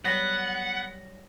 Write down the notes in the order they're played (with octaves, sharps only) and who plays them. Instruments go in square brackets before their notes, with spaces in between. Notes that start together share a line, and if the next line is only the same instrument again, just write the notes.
[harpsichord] F#3 G3 C#5 [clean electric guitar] B3 [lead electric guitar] F#5 [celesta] A#6